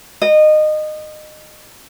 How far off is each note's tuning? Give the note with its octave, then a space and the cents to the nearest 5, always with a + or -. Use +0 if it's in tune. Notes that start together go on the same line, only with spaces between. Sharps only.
D#5 -25